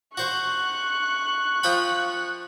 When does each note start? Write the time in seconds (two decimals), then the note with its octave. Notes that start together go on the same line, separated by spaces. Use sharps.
0.17 F#4 C5 C#6 F#6
1.63 F3 G5 B5